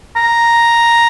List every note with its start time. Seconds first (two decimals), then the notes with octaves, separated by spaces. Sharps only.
0.16 A#5